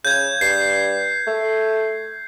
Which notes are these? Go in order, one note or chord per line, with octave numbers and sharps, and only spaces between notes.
C#3 G6 G#6
G2 C7
A3